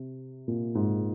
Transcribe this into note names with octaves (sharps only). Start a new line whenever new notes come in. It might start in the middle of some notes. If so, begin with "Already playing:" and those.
Already playing: C3
A#2
G#2